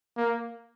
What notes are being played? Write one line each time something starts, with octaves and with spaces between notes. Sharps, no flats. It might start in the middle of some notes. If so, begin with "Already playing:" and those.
A#3